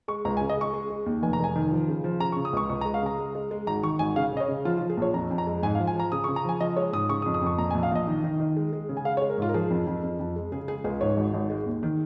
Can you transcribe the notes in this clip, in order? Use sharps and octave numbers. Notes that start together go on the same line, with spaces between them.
G#3 C#6
C#2 A#5
G#5
C#3
D#5
G#3 C#6
G#3
G#3
D#2
F1 G#5
A#5
F1 G#5
D#3
F3
C#3
F3
C#3 A#5
C#6
C#3
D#6
C#2 C#6
C#2 C#6
A#5
G#3
F5
C#3 A#5
G#3
G#3
G#3
G#1 A#5
D#3 C#6
G#1 G#5
C#3 F5
C#3 D#5
C#5
C#3
F3 F4
F4
F3
G#4
A#1 C#5
F2 A#5
F2
A#5
G#3
G#2 G#5
F5
F3
G#5
F3 A#5
C#3 D#6
C#6
C#3
A#5
F3 G#5
F3 D#5
G#3 C#5
G#2 D#6
C#3 C#6
D#6
F2
D#6
F2 C#6
A#1 A#5
G#5
A#1
F5
A#1 D#5
D#3
D#3
D#3
G#3
G#3
C#3
G#5
G#3 F5
C#5
G#3
A#4
G#2 F4
A#4
F3 G#4
F2
F2
F2
F2
G#3
C#3 G#4
G#3 G#4
C#2 G#4
G#2 C#5
G#1
G#1
G#3
D#2
D#3